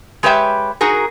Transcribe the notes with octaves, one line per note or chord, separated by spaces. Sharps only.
G#3 G4 B4 C#5 E5 G5
D#4 F#4 G#4 A#4